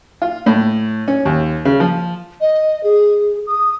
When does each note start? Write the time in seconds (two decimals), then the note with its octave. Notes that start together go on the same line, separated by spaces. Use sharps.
0.22 F4
0.46 A2
1.08 C#4
1.25 D#2
1.65 C#3
1.80 F3
2.41 D#5
2.84 G#4
3.47 D#6